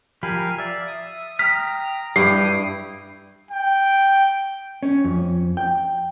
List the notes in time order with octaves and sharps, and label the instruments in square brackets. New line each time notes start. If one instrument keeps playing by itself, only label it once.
[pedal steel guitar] F3 G4 B5 [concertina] A#4 F5 G#5
[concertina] D5 F5 [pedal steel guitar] E5
[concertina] D#6
[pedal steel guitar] G5 D#6 F6 [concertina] A#5 [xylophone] B6
[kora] G2 [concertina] E4 G5 D#6 [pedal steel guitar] D6 [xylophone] C7
[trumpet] G5
[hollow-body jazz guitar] C#4
F2
G5